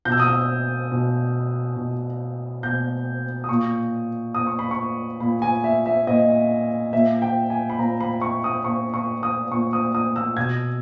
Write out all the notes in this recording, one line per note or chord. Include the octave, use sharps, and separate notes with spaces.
B2 G6
E6
D#6
E6
B2
B2
B2 G6
D#6
A#2 C#6
A#2 D#6
C#6
B5
C#6
A#2 B5
G#5
E5
E5
A#2 D#5
A#2 E5
G5
G#5
B5
A#2 A#5
B5
C#6
D#6
A#2 C#6
C#6
D#6
A#2 C#6
D#6
D#6
E6
B2 G#6